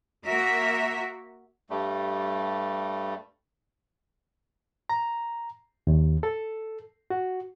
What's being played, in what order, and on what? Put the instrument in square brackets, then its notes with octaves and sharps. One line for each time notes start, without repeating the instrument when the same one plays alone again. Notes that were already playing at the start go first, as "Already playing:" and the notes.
[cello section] A#3 F#4 A#4 E5
[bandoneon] G2 G3 A3
[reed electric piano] A#5
D#2
A4
F#4